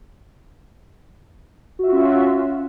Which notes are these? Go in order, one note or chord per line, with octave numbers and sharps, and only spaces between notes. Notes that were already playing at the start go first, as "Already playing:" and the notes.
C#4 F4 F#4 E5